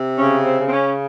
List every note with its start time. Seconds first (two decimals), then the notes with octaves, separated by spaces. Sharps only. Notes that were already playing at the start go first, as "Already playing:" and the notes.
Already playing: C3
0.18 C#3 C#4
0.45 C4
0.59 C#3
0.67 C4
0.72 C#4